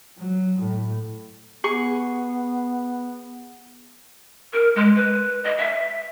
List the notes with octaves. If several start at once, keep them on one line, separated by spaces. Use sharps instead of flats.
F#3
A2
B3 G#4 C#6
A#4
G#3
B4
D#5
E5